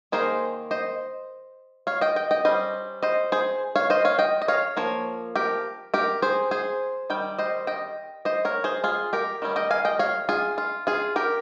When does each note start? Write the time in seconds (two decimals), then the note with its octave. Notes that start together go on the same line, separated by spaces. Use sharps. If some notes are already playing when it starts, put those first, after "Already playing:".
0.12 D#3 A#3 D#4 G#4 C5
0.71 C5 D#5
1.87 C#5 F5
2.01 D#5 G5
2.16 D#5 G5
2.31 D#5 G5
2.45 G3 C#4 C5 D#5
3.03 C5 D#5
3.32 G#4 C5
3.76 C#5 F5
3.90 C5 D#5
4.05 C#5 F5
4.19 D#5 G5
4.42 D#5
4.48 C#5 F5
4.77 F3 A#3 C#5
5.36 G4 A#4
5.94 G4 A#4
6.22 G#4 C5
6.51 G#4 C5
7.10 D#3 G3 G5
7.39 C5 D#5
7.67 D#5 G5
8.25 C5 D#5
8.45 A#4 C#5
8.64 G#4 C5
8.84 F4 G#4
9.13 G4 A#4
9.42 D#3 G3 C#4
9.56 D#5 G5
9.71 F5 G#5
9.85 D#5 G5
9.99 C#5 F5
10.29 F4 G#4
10.58 F4
10.87 F4 G#4
11.16 G4 A#4